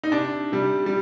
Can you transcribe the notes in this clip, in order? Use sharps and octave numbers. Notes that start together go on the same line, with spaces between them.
D#4
C3 D4
C3 G3
G3